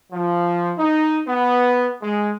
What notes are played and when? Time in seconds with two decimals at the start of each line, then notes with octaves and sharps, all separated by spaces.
0.12 F3
0.78 D#4
1.27 B3
2.02 G#3